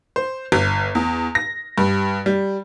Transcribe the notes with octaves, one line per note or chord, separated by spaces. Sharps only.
C5
G1
E2
A#6
G2
G3